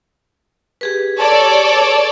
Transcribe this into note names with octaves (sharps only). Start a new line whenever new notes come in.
G4 G#4 B4
A4 C#5 D5